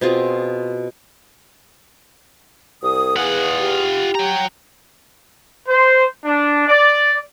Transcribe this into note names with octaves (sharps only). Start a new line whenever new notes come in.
B2 C4 F4 G#4
C2 D#6
E2 F4 G#4 F#5
G4
F#3 G5 A#5
C5
D4
D5